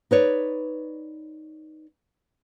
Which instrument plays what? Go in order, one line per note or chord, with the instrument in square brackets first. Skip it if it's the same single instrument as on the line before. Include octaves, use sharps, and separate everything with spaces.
[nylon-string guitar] D#4 B4 C#5 D5